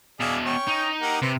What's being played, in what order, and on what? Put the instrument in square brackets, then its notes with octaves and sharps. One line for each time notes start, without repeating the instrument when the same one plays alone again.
[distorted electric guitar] B2 E5 [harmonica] G#4 D5 F5
[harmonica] C#4 G5 C#6
[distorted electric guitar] D#4
[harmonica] A#3 G4 F#5
[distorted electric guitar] C3 [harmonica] B4 C5